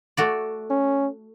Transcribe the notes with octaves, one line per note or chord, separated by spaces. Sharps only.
A3 F#4 D5
C#4